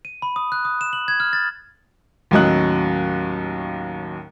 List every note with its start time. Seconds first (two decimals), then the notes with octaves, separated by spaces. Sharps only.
0.05 D#7
0.22 B5
0.36 D#6
0.52 F#6
0.65 D#6
0.81 E7
0.93 F#7
1.08 G#6
1.20 F6
1.33 A6
2.31 D#2 A2 F#3 C#4 D#5 F#6